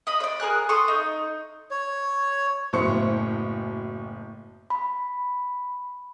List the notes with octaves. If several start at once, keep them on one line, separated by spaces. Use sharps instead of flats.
D#5 B5 D#6
C#5 D5
G#4 A#4 G#5 F#6
A4 C6 C#6 D#6
D#4
C#5
F#1 B1 A2 C5 C#6 C#7
B5